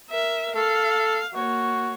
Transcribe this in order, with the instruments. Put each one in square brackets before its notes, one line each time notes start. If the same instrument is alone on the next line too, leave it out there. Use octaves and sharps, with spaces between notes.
[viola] A#4 E5
[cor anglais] A4 [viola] F5
[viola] A#3 C#5 [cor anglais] F#4